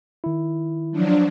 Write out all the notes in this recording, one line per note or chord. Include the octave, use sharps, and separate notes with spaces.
D#3 E4
F3 F#3 D4